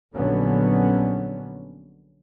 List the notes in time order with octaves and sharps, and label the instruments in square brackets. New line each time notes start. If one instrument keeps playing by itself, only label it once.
[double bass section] A#1 D3 F#3 B3 C#4